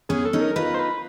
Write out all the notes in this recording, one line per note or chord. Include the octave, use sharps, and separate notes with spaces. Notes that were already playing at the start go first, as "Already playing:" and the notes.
B3 C#4 G#4
A4
C#4 D#4
A#4
D#4 F4 B4
C5
B4